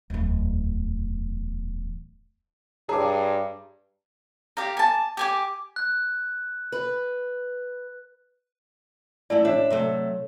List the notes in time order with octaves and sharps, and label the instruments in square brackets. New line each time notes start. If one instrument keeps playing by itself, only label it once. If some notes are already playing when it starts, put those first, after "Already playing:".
[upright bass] D1 E2
[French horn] G2 [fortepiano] G#4 D6 [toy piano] C#5 A5 A#5
[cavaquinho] G4 F5 A#5
G#5 A5
G4 G#5 D6
[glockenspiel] F#6
[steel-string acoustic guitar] B4
[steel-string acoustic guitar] E3 A3 E4 [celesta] D5
[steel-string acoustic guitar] D4 E5 [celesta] C#5
[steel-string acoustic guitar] C3 F#3 A3